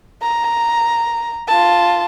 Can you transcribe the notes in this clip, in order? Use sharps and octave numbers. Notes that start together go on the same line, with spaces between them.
A#5
F4 A5